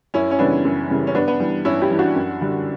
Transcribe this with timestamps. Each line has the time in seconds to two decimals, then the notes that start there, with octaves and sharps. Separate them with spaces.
0.14 F#2 C#4 E4
0.31 C#4
0.39 C#3 E3 G3 B3 D4
0.65 F#2
0.90 C#3 E3 G3
1.07 C#4
1.15 G2 B3 D4
1.28 B3
1.40 E3 G3
1.65 G2 C#4 E4
1.82 E4 G4
1.90 E3 G3
1.99 D4 F#4
2.16 F#2
2.41 D3 G3